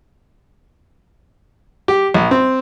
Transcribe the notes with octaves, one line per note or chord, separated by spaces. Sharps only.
G4
A#1
C4